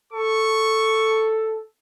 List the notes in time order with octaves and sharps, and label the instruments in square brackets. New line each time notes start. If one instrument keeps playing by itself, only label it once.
[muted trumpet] A4 [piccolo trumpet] C#6